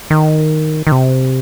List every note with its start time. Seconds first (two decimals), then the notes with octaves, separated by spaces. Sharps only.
0.10 D#3
0.87 D#3
0.92 C3